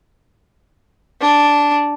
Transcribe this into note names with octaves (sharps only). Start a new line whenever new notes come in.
D4